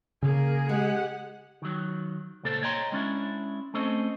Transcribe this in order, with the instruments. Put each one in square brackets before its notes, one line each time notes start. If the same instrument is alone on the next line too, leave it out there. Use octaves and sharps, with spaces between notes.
[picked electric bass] C#3 [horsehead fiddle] A#3 A#4 [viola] G#4
[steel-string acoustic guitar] G#3 [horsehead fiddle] G4 F#5
[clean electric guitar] D#3 F#3
C#2 A#2 A#3 A4 C5 D5
C#5 D#5 G5 A#5 C6
G#3 C#4 D4 E4
A3 C4 C#4 A4 C5 D#5